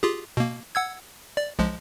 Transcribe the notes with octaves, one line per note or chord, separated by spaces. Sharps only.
F4 G4 G#4
B2 A#3
F#5 E6 G#6
D5
B1 F3 G#3